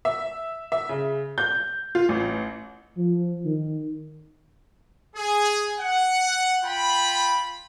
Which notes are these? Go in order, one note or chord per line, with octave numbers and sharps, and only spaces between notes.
E5
E5
C#3
G6
F4
A1
F3
D#3
G#4
F#5
F4 G5 B5